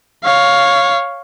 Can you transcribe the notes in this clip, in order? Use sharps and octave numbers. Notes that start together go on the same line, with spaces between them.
C#5 F5